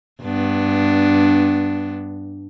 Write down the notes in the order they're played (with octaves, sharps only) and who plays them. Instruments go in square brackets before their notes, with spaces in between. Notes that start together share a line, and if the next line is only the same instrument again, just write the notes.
[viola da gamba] G2 B3 D4